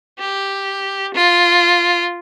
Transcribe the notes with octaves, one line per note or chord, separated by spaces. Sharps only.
G4
F4